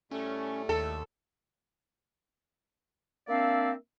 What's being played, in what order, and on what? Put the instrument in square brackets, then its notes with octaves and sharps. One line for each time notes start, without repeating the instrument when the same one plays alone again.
[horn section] A2 G3 A3 [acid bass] C#4
[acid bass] D#2 [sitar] A4
[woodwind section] A#3 C4 D4 D5 E5 F5